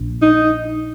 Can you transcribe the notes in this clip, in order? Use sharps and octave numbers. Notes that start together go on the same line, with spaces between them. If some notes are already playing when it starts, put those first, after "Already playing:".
Already playing: A#1
D#4